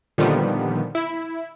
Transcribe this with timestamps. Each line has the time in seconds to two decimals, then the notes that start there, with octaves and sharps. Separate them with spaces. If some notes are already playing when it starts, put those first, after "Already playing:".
0.18 A#2 D3 D#3 F3 G3 B3
0.95 E4